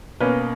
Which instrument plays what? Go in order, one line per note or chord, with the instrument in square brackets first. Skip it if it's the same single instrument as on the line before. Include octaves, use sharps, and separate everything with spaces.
[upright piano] B2 A#3 C#4 B4